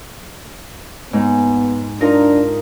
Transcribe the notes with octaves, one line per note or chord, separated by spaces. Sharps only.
G#2 B3
D4 D#4 F4 A#4